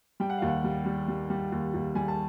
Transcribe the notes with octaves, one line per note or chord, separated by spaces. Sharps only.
G3 G5
F#5
D#2 F5
F#5
G3
G3
G3
G3
D#2
D#2
G3 G#5
A5